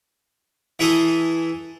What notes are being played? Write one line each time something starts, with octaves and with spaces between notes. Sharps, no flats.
E3 E4 G#4 A4 C6 D#6